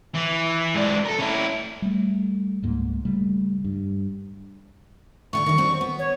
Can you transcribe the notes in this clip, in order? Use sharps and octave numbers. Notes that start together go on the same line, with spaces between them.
E3
G#2 D4
A4 A#4
C#4 E4
G3 A3
C#2 G#2 A#3
C#3 G3 A3
G2
A2 D3 D4 C#6
D#3 G3
F#3 C4 D4
B3
C#5